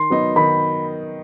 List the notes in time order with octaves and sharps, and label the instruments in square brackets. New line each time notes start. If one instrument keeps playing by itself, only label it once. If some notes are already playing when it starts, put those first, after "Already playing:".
Already playing: [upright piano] D#3 [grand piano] C6
[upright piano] F#3 B3 D#4
[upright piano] D#3 [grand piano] B5